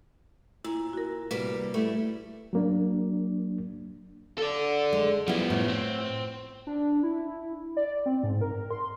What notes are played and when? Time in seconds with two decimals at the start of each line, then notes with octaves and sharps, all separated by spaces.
0.65 A#2 E4
0.93 F#4 A#4
1.31 C3 G3 A#3 B4
1.74 G3 A3 E4
2.53 F#3 A#3 D4
4.38 A4 D5
4.93 G#3
5.28 F3 G3 B3 E4
5.50 A2
5.68 C4
6.67 D4
7.03 E4
7.77 D5
8.06 C4
8.23 G#2
8.41 A#4
8.71 C6